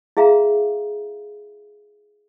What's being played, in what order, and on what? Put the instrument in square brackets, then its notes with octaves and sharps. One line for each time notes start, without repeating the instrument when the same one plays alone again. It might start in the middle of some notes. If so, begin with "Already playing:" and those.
[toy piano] E4 G#4 E5 F5 A#5